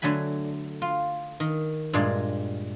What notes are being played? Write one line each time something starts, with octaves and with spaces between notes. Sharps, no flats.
D3 F#3 A3 G#5 B5
F4
D#3
G2 A#2 G#3 D5 E5